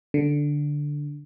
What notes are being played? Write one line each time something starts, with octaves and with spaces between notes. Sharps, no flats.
D3